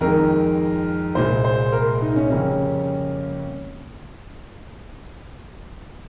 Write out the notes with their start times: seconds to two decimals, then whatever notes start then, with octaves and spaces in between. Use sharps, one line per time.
0.01 F2 D#3 G#3 A#4
1.15 C2 A#2 G#3 C5
1.45 C5
1.72 A#4
2.01 D#4
2.16 C#4
2.30 F2 C#3 G3 A#3 C#4